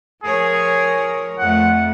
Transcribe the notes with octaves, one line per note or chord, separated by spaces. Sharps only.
F3 G#4 A#4 C#5
F2 A3 F#5